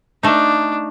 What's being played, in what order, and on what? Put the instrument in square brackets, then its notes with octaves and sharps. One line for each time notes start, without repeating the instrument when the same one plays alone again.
[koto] A3 D#4 [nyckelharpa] D4